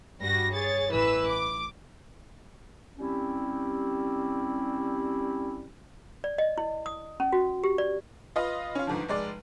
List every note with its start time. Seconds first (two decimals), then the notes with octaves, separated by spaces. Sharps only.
0.21 G2 G3 F#4 A#6
0.52 G#4 C#5 A6
0.91 A1 E3 B4 E6
1.28 D6
2.99 G3 C4 C#4 E4 G4
6.24 D5
6.38 D#5
6.58 E4
6.86 D#6
7.20 C#4
7.33 F#4
7.64 G4
7.78 D5
8.36 F4 B4 D#5
8.75 C#4 F4
8.87 G1 G#2 D3 F3
9.08 F1 G#3 D5